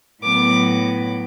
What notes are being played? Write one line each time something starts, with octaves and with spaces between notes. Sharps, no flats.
A2 F#3 B3 D6